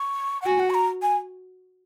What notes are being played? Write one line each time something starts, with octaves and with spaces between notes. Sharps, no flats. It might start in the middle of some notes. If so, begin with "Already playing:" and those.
Already playing: C#6
F#5
F#4 G#5
F#5
C#6
A#5
G#5